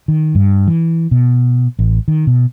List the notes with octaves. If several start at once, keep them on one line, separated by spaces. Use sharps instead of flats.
D#3
G2
E3
B2
A1
D#3
B2